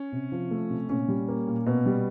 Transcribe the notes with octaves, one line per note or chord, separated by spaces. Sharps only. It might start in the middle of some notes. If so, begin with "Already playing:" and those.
Already playing: C#4
C3
F3
A3
C3
A#2 C#4
G3
A#3
A#2
B2
G3